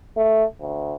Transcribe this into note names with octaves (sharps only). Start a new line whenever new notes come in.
A3
D2